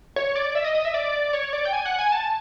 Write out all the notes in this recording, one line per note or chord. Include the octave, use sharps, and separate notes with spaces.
C#5
D5
E5
D#5
D#5
E5
D5
C#5
D5
G5
G#5
F#5
G#5
A5